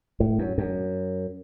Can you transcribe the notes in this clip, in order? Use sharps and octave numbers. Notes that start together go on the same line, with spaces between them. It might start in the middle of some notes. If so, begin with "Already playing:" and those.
A2
F#2
F#2